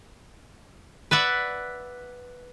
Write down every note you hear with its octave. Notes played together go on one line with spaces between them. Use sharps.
B4 D5 E5 F#5